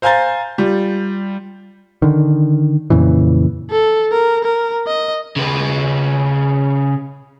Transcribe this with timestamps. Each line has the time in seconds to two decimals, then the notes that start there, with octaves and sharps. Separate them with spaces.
0.02 C5 F5 G#5 A#5 G6 A6
0.58 G3 F4
2.02 D3 D#3
2.90 F2 A#2 C#3 E3
3.71 A4
4.12 A#4
4.44 A#4
4.87 D#5
5.36 C#3 B4